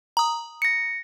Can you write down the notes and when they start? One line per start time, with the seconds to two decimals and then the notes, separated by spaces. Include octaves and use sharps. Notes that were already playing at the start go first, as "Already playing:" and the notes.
0.17 A#5 D#6
0.62 A#6 C#7